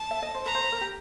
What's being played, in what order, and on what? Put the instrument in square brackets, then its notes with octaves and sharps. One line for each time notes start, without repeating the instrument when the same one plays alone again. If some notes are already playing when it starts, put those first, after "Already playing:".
Already playing: [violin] A5
[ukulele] E5
D#5
C5
[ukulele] B4 [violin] A#5
[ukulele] C5
B4
A#4
G4